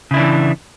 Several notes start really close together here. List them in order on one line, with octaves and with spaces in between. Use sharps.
C#3 E4 D4 E3